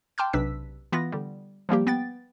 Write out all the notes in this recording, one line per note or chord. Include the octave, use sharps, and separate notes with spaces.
G5 A5 C6 D6 F6 G6
B1 C3 D4 B4 E6 B6
E3 B3 F4 A#6
D3 G3
F3 G3 A#3 G4
B3 G5 A6